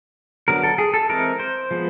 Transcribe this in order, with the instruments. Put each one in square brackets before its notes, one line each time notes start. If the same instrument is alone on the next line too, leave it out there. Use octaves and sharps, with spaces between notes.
[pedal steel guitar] D3 F#3 B3 A#4
A4
G#4
A4
E3 G#3 C4 A#4
C5
F3 G#3 B3